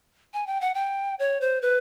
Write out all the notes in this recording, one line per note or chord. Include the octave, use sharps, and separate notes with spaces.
G#5
G5
F#5
G5
C#5
C5
B4